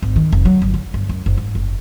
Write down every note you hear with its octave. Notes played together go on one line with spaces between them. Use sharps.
G#1
D#3
F1
F#3
G1
D3
G1
F#2
F#1
G#2
F#1